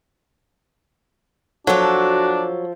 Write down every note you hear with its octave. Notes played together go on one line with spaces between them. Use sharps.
F3 F#3 D4 F#4 A4